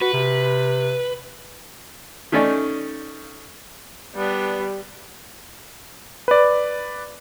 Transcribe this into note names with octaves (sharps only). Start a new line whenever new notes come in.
F#4 B4
C3
D#3 A3 C#4 D#4 D5
G3 B3 D4
B4 D5